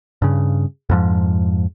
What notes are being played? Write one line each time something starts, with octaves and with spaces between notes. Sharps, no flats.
G2 C#3
F2 G#2 F3